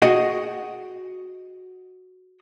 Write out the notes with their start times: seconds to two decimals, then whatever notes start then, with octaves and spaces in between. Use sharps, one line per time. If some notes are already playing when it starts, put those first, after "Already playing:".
0.02 F#4 G#4 D#5 F#5 G5